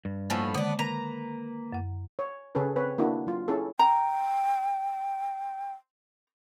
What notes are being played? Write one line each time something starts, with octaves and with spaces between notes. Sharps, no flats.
G2
A2 F3 A#3 B3
D3 D#3 G#3 B3 D4
A#3 B4 A#5
F#2 F#5
C#5
C#3 C#4 G#4 A4 B4
C4 B4 C#5
A#3 D4 E4 F#4
F#3 F4
C#4 E4 G#4 A4
G5 A#5